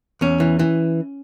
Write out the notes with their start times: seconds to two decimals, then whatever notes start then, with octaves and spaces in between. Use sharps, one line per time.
0.21 E2 C#4
0.40 E3
0.59 E3